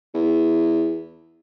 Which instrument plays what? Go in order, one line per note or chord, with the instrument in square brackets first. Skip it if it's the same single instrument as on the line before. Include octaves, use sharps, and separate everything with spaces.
[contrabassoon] E2